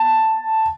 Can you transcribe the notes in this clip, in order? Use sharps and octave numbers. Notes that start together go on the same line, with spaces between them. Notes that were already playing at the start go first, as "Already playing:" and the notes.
Already playing: A5